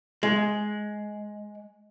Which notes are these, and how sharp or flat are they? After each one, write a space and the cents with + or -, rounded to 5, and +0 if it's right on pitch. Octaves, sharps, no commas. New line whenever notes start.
G#3 +10